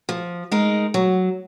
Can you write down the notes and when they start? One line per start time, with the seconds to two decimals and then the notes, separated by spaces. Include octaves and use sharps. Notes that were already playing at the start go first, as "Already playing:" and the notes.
0.09 F3
0.52 G#3 D#4 A#4
0.94 F#3